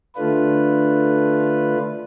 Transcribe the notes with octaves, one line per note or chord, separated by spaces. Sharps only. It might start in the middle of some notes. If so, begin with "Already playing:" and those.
D3 A3 D4 F4 B4